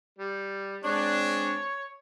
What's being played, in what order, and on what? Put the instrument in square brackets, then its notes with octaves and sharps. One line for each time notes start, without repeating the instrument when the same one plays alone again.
[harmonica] G3
[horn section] G#3 C4 D4 [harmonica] C#5